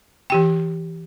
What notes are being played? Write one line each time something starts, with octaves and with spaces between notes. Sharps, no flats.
E3 G4 G5